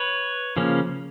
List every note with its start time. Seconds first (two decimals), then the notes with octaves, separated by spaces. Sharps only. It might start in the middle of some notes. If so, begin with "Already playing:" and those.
Already playing: B4 C#5
0.57 C#3 F3 A#3 C#4